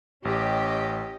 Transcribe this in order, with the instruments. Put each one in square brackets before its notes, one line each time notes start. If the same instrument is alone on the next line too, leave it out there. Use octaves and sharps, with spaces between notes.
[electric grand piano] A1 [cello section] C#4 G4 D#5